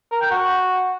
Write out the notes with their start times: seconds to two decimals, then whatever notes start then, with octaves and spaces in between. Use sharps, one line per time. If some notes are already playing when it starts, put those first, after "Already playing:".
0.12 A#4
0.21 G5
0.31 F#4